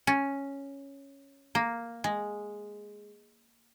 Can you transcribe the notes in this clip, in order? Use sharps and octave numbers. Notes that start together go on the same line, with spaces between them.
C#4
A#3
G#3